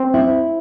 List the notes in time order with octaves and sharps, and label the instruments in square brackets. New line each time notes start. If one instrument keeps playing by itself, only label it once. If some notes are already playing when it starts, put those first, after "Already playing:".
Already playing: [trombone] C4
[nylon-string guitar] E4